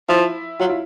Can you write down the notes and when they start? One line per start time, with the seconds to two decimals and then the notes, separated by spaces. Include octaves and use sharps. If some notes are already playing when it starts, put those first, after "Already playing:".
0.09 F3 E4
0.59 F#3 F4
0.69 E4